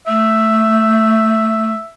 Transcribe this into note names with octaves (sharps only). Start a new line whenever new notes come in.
A3 E5